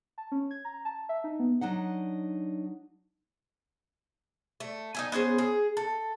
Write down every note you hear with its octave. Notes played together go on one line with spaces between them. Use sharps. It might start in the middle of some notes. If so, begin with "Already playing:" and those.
A5
C#4
G#6
A#5
A5
E5
D#4
B3
F#3 D4 D#4 F#5
A3
D#4 E4 G#5
B3 C#4 G#4 C5
G#4
A4